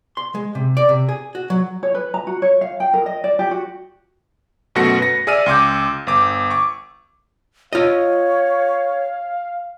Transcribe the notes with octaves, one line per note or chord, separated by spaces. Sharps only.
C6
G#3
C3
D5
C3
G#4
F#4
F#3
C#5
B4
A#5
F#4
C#5
F5
G5
A#4
D#5
D5
G4
F#4
F#2 B2 A3 F#4 A#6 C#7
B4 A#6
G#4 D5 E5 E6 F6 D#7
C#2 C6 D6 G6
G1 D6
C#6 D6
F4 C#5 D#5 F5